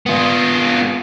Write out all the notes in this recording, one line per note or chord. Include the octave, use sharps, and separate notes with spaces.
B3 F4